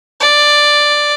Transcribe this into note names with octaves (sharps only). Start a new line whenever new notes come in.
D5